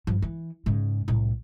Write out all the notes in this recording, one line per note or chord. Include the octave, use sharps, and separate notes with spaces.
G2 F3
E3
G#2 C#3
C2 A2